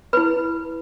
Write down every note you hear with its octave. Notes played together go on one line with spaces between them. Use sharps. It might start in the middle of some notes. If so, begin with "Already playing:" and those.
E4 B4 B5